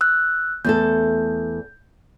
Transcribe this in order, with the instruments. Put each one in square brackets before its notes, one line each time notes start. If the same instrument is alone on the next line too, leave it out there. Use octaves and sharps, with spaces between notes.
[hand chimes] E6 F#6
[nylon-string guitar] E2 A3 A4 [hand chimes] G6